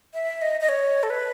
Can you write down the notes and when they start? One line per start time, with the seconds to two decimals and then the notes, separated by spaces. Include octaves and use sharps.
0.14 E5
0.42 D#5
0.60 D#5
0.69 C#5
1.03 A4
1.10 B4